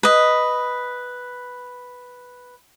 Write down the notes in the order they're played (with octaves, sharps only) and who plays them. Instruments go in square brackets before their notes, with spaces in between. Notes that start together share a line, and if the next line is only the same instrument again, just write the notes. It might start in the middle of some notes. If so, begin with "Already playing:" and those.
[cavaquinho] B4 D#5